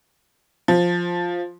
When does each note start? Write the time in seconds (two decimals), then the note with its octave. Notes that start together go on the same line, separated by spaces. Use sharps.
0.68 F3